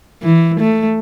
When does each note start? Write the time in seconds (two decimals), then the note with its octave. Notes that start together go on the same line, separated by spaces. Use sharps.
0.22 E3
0.60 A3